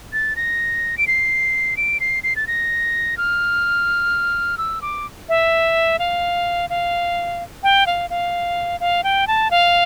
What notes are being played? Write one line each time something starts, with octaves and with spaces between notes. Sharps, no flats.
A6
A#6
D7
C7
D7
C7
C7
A6
A#6
F6
E6
D6
E5
F5
F5
G5
F5
F5
F5
G5
A5
F5